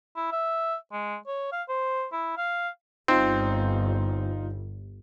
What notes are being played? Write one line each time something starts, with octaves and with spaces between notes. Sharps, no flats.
E4
E5
G#3
C#5
F5
C5
E4
F5
G1 C4 D#4 F4